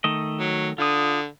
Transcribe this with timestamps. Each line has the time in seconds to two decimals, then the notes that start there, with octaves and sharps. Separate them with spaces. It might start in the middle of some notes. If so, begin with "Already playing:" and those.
0.04 D#3 A3 D#5
0.40 F#3
0.78 D3 F4 D#6